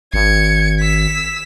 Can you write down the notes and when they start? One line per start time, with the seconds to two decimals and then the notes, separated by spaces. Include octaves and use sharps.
0.14 G#1 G#6 C#7
0.80 E6 B6